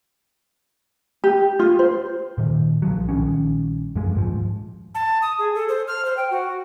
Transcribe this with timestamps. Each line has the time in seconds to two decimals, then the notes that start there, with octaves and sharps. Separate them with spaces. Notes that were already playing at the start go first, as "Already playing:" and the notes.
1.24 G4
1.59 F4
1.79 C5
2.38 A#2 D#3
2.82 B1 F3 F#3
3.09 A#1 D#3 G3 C#4
3.95 F#2 F3 G#3
4.15 D#1 G#2 F3
4.95 A5
5.22 D#6
5.39 G#4
5.55 A4
5.69 C5
5.87 F6
6.05 C5
6.17 G5
6.31 F#4